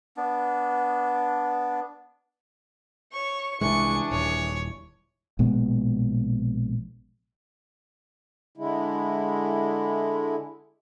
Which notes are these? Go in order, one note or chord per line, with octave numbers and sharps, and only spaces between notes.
B3 D4
C#5 C#6
C2 E3 G#3 D4 G#4 C#6
D#1 C#5
A#1 B2 G#3 B3
D3 G#3 E4